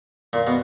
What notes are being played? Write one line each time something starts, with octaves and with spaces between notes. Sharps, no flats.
A#2
B2